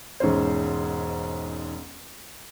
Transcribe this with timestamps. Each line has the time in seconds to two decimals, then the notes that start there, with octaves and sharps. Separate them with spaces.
0.20 E1 G#2 C#4 C5